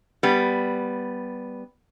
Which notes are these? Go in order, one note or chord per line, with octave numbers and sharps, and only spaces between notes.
G3 B3